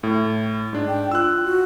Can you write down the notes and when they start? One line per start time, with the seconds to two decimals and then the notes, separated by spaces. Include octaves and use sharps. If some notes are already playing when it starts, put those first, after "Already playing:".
0.03 A2
0.73 G#2 D4
0.88 G5
1.11 F4 E6 F#6
1.44 F#4